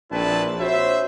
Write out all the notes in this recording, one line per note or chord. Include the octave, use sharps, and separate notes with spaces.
A#1 C4 D4 E4 B4 A5
F#4 C5 C#5 E5